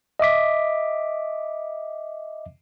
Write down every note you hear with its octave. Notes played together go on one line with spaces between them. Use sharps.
D#5 E5 D6 B6